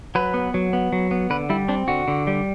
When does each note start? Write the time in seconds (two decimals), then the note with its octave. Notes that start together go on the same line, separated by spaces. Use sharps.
0.15 F#3 B4
0.34 B3
0.54 F#3
0.73 B3
0.93 F#3
1.11 B3
1.30 D3 B4
1.50 G3 E4
1.68 C4 D4
1.88 D3 F#4
2.08 D3
2.27 G3